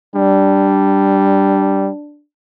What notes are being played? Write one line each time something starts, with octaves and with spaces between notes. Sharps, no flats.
G3 D4